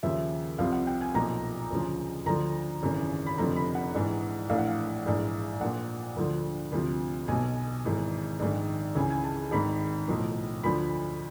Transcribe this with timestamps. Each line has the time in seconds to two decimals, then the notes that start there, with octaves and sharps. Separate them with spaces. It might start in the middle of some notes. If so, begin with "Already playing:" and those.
0.03 D#2 C#3 F3 E5
0.58 C2 C3 F3 F5
0.72 F#5
0.87 G5
1.01 G#5
1.14 B1 A#2 F3 A#5
1.71 D2 C#3 F3
2.26 D2 D3 F3 A#5
2.83 G#1 F#2 C#3 E3
3.26 B5
3.38 F1 F2 D3 F3 A#5
3.56 B5
3.75 F#5
3.94 A#1 G#2 E3
4.50 A#1 A2 E3 F5
4.58 F#5
4.67 F5
5.05 A#1 G#2 E3
5.61 A#1 A#2 F3 F#5
6.16 D2 D3 F3
6.72 D2 C3 F3
7.28 B1 B2 G#5
7.84 G#1 G#2 E3
8.40 A#1 G#2 D#3
8.95 C#2 C#3 E3 G#5
9.10 G#5
9.24 A5
9.51 G#1 G#2 D#3 B5
10.08 B1 A2 F3
10.63 D2 D3 F3 B5